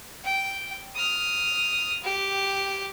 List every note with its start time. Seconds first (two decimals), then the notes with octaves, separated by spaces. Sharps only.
0.25 G5
0.95 D#6 F6
2.04 G4